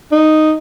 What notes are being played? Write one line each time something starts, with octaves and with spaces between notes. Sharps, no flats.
D#4